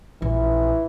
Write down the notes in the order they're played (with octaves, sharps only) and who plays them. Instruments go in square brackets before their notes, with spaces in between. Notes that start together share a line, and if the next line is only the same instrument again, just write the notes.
[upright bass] A#1 [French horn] E3